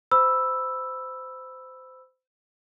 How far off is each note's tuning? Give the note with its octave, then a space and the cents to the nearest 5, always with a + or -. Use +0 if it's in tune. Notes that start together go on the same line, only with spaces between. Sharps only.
C5 -25 B5 +0 E6 +5